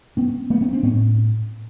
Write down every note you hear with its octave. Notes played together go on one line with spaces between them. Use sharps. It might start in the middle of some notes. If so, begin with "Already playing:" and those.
B3 C#4
A3 B3
B3 C#4
C4 D4
A2 B3 C#4